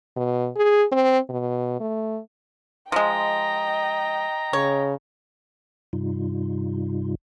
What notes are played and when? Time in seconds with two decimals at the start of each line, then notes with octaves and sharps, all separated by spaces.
0.16 B2
0.56 G#4
0.92 C4
1.30 B2
1.80 A3
2.92 F3 G#3 D#5 G5 A#5
4.53 C#3 C#5
5.93 G2 C3 G3 D#4 F4